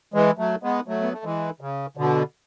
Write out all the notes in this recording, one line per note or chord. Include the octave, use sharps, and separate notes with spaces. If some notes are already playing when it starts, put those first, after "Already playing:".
E3 G#3
F#3 A3
G#3 B3
F#3 A3
B3
A3
E3 G#3
C#3
B2 D3